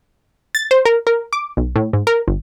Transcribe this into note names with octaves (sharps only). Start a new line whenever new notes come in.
A6
C5
A#4
A#4
D6
B1
A2
G#2
A#4
G1